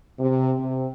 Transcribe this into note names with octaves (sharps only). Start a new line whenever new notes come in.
C3
C3